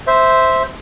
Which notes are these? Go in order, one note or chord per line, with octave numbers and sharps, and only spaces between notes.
C5 E5